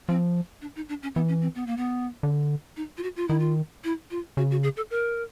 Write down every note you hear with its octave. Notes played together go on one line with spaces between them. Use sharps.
F3 C4
D4
D#4
D4
C#4
E3 B3
C#4
C4
B3
A#3
B3
D3
D#4
F4
F#4
F4
D#3 E4
F4
E4
F4
C#3 F#4
F#4
G#4
A4
A#4